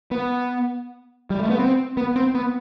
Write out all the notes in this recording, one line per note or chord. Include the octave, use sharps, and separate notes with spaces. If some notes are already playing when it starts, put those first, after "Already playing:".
B3
G3
A3
B3
C4
B3
C4
B3